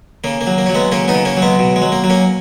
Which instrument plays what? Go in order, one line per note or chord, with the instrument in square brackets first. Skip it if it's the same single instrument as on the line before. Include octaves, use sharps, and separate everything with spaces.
[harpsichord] C#3 A#3
A#3
F#3
A#3
F#3 C#4
G#3 B3
C#3 A#3 C#4
B3 D#4
C#3
A#3 C#4
F#3
G#3 B3
B2
G#3
F#3
A#3
F#3
A#3 C#4